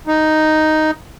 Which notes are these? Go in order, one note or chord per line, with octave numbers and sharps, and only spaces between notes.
D#4